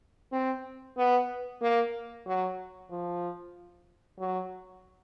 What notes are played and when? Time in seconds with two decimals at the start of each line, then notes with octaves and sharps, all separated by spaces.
0.32 C4
0.97 B3
1.61 A#3
2.26 F#3
2.90 F3
4.19 F#3